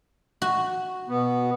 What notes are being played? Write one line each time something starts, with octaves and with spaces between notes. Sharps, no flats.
F#4
B2 B3